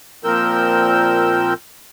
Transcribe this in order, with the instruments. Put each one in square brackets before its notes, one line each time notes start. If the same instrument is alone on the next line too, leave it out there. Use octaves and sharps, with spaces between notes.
[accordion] A#2 F3 C4 A#4 E6 G6